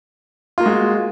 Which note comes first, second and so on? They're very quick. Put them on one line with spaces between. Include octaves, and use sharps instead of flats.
F4 A#3 F#4 G#3